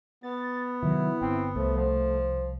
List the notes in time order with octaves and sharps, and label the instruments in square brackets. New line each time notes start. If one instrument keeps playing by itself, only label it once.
[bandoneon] B3 [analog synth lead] A6
[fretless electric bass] C3 D#3 F#3 [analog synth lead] E4
[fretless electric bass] G1 [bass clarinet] C4
[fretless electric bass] C2 [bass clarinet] F3 [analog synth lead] A3
[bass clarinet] F3